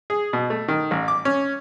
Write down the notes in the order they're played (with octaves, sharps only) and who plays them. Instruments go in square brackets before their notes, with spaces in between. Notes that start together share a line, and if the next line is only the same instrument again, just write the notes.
[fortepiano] G#4
B2
A3
D#3
A1
D6
C#4